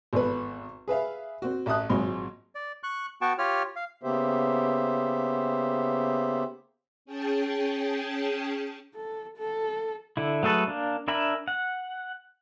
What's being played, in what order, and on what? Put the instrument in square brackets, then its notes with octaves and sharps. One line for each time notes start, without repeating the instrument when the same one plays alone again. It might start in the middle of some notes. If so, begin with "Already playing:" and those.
[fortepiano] G#1 E2 A4 B4
G#4 B4 E5 F5
C4 F#4
A1 E5 A5 D#6 F#6
G#1 A#2 F#3 G#3 C4 C6
[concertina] D5
C#6 F#6
B3 F#4 G5 A5 C#6
F4 G4 C#5 F6
F5
[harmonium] C#3 A#3 B3 G4 C5 E5
[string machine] C#4 G#4 G5 A5
[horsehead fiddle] A4
A4
[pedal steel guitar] D3 E4
F#3 A3 G#4 A4 B4
A#3 D4
D4 A#4 E5 G#5 B5
F#5